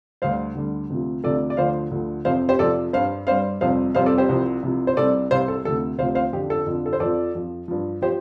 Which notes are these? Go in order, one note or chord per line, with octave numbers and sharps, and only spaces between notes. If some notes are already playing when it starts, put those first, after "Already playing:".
D2 D3 G3 C5 F5
D2 D3 G3
D2 C3 F3
D2 C3 F3 A4 D5
D5
D2 D3 F3 C5 F5
D2 D3 F3
F2 C3 F3 C5 F5
G4 C5
F2 C3 F3 A4 D5
G2 G3 C5 F5
G2 G3 C5 F5
F2 C3 G3 C5 F5
F2 C3 G3 C5 F5
A4 D5
G4 C5
C2 C3 F3
C2 C3 F3
C5
C2 C3 G3 A4 D5
C2 C3 G3 C5 F5
A4
D2 C3 F3 A4
D2 C3 F3 C5 F5
C5 F5
F2 D3 F3 G4
A4
F2 D3 F3
A4
C5
F2 A4 D5
F3
F2 F3
G2 F3
F3 G4 C5